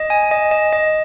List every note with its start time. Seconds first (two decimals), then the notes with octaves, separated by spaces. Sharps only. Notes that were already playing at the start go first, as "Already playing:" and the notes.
Already playing: D#5
0.10 G#5
0.31 D#5
0.51 D#5
0.73 D#5